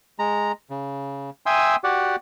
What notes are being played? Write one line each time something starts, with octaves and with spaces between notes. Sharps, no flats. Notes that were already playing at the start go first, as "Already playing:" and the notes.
G#3 A#5
C#3
E5 G5 G#5 C6 D#6 E6
F#4 G4 D5 F#5